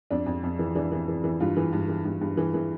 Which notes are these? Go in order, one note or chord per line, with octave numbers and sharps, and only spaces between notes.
F2 D4
F2
F2
E3
E3 D4
E3
E3
E3
G2 F4
E3
G2
E3
G2
G2
E3
E3